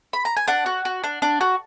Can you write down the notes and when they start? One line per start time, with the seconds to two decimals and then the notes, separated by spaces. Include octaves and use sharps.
0.13 B5
0.25 A#5
0.37 G#5
0.48 D4 F#5
0.66 F#4
0.85 F#4
1.04 D4
1.22 D4
1.41 F#4